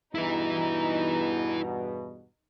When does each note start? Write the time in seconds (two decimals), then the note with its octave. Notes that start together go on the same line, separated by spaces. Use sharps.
0.15 E2 G2 B2 D#4 E4 B4